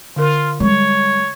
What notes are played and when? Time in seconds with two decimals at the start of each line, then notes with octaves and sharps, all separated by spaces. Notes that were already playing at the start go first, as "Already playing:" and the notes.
0.16 D3 F4 A#4
0.60 G3 G#3 C#5